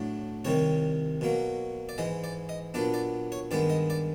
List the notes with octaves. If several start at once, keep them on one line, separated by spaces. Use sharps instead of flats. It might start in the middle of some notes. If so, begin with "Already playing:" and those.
Already playing: A2 F#3 A3 D4
C2 C3 D#3 G3 C#5
B2 F#3 A#3
D5
G#2 E3 G#3 D#5
D5
D#5
A#2 F#3 B3 D4 D5
D5
C#5
G2 D#3 G#3 B3 D5
D#5
D5